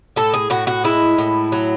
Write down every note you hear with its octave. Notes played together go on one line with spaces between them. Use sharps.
A2 A4
G#4
A2 F#4
F#4
G#3 E4
A2
F#3